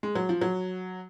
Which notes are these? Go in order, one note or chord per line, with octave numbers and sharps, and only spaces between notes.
G#3
F#3
F3
F#3